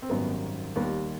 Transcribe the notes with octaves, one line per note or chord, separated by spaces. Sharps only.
C4
G#1 F#2 D#3 G3 B3
D#2 D#3 G3 B3